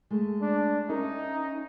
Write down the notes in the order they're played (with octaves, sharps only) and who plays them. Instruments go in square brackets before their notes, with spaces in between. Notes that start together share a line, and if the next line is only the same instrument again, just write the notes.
[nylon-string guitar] G#3 A3
[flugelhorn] D4
[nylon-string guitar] C#4 A#4 E5 [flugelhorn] D#4